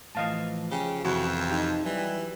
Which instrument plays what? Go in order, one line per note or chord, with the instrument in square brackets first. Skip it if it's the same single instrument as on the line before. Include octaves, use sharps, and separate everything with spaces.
[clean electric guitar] A2 E3 [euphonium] F3 [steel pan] D#5 F5 A5
[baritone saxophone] C#3 [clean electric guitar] G4
[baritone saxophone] F2 [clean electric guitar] C3 E3 E4 [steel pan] F#4
[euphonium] D#4 [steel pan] G4
[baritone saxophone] E3 [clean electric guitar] F#3 [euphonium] G3